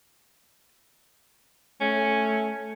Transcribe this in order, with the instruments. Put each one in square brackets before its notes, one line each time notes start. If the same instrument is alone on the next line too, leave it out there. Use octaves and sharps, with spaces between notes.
[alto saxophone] A3 [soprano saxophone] C#4